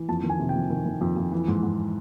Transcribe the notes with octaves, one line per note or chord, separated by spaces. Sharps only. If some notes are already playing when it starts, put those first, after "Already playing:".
Already playing: E3
F2 A5
D#3
G#5
C3
G5
F2
D#3
D#3
F2
F2
E3
G#2
G#2